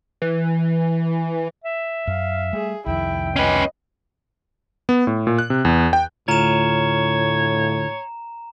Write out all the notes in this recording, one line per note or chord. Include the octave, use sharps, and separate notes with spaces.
E3
E5
F#2 F5
G3 A3 G#4
C2 F2 D#3 E4 G5
C#4 B4 D#5
B3
A2
A#2
F#6
C3
E2
G5
D2 A2 F4 C#5 A#5 E7